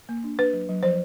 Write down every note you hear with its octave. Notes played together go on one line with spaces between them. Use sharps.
A#3
D4
D4 B4
F#3
F#3
F3 C5